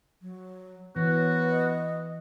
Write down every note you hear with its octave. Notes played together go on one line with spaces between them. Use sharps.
F#3
E3 B3 F#4 C#5
D#5